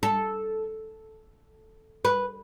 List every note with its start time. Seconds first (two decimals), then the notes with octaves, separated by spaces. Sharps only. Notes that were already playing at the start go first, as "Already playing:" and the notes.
0.03 A4
2.05 B4